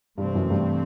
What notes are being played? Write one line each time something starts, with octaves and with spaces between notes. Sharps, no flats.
G2 C3 E3 A3 C4
F#2
G2